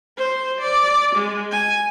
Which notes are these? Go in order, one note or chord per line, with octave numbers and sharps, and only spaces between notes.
C5
D5
G#3
G#5